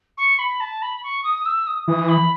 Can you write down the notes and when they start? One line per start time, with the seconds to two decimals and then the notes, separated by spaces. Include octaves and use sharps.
0.17 C#6
0.38 B5
0.60 A5
0.82 B5
1.03 C#6
1.23 D#6
1.45 E6
1.66 D#6
1.87 E3 D#6
2.08 B5